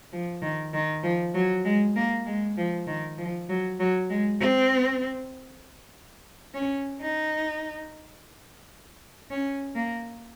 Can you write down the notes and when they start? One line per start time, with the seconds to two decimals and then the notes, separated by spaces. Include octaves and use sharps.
0.13 F3
0.42 D#3
0.74 D#3
1.03 F3
1.35 F#3
1.65 G#3
1.96 A#3
2.26 G#3
2.57 F3
2.87 D#3
3.18 F3
3.49 F#3
3.80 F#3
4.10 G#3
4.40 C4
6.55 C#4
7.01 D#4
9.31 C#4
9.76 A#3